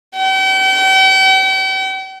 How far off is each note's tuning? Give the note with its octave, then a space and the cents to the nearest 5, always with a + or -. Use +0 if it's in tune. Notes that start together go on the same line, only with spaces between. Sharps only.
G5 -40